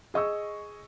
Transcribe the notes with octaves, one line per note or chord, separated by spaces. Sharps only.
G#4 D#5 C#6 E6